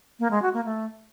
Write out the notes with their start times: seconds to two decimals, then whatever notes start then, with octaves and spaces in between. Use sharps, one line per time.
0.19 A#3
0.31 G#3
0.42 F#4
0.54 A#3
0.65 A3